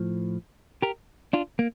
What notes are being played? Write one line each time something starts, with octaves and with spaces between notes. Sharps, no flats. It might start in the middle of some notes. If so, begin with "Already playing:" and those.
Already playing: A2 F3
G4 A#4
D4 F4
A#3